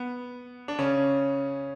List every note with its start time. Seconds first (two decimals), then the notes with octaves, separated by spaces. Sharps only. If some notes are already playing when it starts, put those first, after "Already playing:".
Already playing: B3
0.68 D4
0.78 C#3 C#4